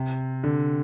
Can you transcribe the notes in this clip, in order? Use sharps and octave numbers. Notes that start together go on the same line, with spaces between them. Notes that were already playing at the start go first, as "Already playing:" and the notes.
Already playing: C3
D3